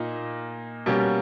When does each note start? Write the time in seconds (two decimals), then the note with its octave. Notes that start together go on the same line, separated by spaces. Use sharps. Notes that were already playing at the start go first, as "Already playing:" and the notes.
Already playing: A#2 A#3 D#4
0.86 B2 G3 A#3 C#4 G4